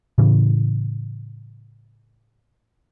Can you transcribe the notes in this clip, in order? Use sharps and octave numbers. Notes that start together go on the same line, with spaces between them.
A2 C#3 E3